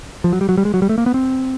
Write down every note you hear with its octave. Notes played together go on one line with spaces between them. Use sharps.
F3
F#3
G3
F#3
G3
G#3
F#3
G3
A3
A#3
B3
C4